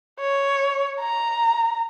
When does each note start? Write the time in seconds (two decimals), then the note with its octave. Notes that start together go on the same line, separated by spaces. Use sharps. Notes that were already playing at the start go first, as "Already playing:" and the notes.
0.20 C#5
1.00 A#5